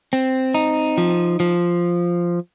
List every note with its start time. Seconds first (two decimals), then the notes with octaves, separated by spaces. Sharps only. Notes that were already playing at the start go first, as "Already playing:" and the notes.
0.13 C4
0.55 D#4
0.98 F3
1.40 F3